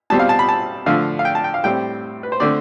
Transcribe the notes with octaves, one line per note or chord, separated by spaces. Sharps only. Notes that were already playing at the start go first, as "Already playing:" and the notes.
B2 G3 C4 A5
F5
A5
B5
A5
D3 F3 A3 F5
F5
G5
A5
G5
F5
A2 G3 C4 G5
B4
C5
D3 A3 C4 D5